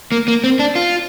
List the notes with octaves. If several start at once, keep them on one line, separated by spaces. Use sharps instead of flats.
A#3
A#3
C4
D4
F4